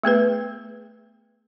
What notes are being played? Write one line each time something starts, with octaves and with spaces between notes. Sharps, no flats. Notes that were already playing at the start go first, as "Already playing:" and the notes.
A3 B3 G#4 B4